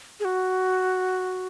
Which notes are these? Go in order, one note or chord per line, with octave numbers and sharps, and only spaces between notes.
G#4
F#4